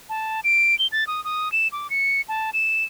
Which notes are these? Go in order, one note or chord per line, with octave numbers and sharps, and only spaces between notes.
A5
D7
G7
A6
D#6
D#6
E7
D6
C#7
A5
E7